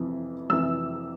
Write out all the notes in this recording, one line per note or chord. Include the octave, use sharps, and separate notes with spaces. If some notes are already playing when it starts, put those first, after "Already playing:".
Already playing: F2 C3 E3
F2 C3 E3 E6